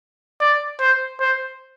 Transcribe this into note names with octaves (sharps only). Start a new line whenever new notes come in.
D5
C5
C5